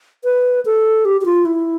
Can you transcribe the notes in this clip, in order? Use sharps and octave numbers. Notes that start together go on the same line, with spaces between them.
B4
A4
G4
G4
F4
E4